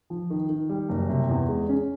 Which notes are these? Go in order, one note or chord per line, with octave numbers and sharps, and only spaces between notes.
F3
D#3
D#3
G3
F#1
C3
E2
G#3
C#4